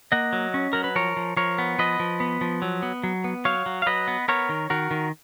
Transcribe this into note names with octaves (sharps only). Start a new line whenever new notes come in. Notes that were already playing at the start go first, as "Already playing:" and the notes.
A#3 D#5 F#5
F#3
C#4
F#3 A#4
B4
F3 A#4 C#5
F3
F3 A#4 C#5
B3
F3 B4 D#5
F3
B3
F3
F#3
B3
F#3
B3
F#3 C#5 F5
F#3
F5
F#3 B4 D#5
B3
B3 A#4 C#5
D#3
D#3 F#4 A#4
D#3